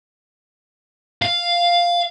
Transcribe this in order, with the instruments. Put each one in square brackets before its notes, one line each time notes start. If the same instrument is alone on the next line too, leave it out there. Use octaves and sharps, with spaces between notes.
[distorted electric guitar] F5